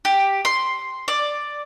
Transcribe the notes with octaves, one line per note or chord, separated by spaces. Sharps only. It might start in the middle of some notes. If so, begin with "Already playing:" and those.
G4
C6
D5